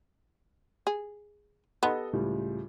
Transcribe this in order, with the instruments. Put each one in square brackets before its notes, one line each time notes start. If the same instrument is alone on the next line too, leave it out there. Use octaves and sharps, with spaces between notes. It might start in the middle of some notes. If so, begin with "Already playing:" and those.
[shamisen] G#4
[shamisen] B3 [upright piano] G4 A4 D#5
[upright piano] C#2 A2 G3